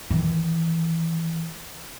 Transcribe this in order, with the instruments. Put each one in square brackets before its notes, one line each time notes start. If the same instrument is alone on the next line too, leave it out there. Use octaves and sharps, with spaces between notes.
[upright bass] D#3 E3